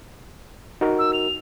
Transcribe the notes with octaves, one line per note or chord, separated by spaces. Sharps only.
D#4 F#4 A#4
E6
F7